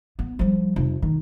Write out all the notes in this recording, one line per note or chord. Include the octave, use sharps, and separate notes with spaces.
B3
F3 G3
F1
D#3